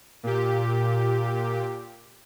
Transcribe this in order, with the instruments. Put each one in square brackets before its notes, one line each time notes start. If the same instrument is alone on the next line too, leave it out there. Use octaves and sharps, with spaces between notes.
[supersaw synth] A#2 G4